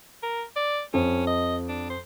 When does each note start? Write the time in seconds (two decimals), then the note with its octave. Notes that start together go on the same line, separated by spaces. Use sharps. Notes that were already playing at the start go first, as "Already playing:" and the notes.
0.23 A#4
0.56 D5
0.94 F2 C#4
1.27 D#5
1.68 D4
1.90 C5